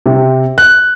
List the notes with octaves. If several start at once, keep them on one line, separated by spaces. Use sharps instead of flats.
C3
F#6